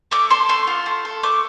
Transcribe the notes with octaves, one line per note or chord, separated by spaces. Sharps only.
A3 D6
A4 C6
A3 C6
F4
A3
A4
A3 D6